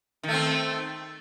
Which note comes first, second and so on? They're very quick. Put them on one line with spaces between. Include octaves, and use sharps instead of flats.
D#3 A3 C4